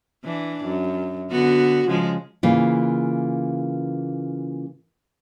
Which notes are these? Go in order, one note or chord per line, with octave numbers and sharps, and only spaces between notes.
E3 D4
F#2
D3 B3 F#4
C#3 F3 G#3
C#3 E3 A#3 F4